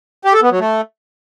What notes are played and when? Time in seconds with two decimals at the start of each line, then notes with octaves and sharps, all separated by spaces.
0.25 G4
0.34 A4
0.42 B3
0.51 F#3
0.60 A3